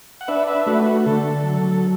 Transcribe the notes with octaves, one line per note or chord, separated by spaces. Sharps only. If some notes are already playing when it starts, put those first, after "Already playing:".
F#5
D4 B4 E5
B4 E5
A3 F#4 B4
F#4
D3 A4
F#3